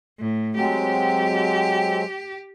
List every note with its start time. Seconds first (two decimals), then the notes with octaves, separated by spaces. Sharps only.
0.19 A2
0.56 F#3 G#3 C4 G4